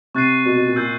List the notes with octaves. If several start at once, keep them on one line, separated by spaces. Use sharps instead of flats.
C3 C#6 F#6 A6 C7 D#7
B2
B2
A#2
A#2 E6 G6 C7